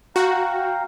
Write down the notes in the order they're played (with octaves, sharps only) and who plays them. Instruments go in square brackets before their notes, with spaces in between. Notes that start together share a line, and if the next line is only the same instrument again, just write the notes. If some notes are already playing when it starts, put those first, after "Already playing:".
[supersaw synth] F#4 [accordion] F5 G5 A#5